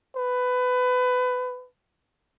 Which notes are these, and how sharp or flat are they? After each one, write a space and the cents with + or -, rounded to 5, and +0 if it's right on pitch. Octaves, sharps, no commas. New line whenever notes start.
B4 +20